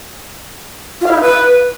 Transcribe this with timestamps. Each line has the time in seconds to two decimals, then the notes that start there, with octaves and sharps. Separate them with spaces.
1.01 F4
1.06 F5
1.11 E4
1.16 D#4
1.21 B4